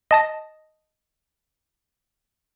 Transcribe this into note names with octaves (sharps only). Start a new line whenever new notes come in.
D#5 A5 A#6